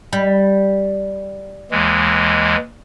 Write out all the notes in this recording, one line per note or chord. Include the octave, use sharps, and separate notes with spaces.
G3
D#2 E3 G#3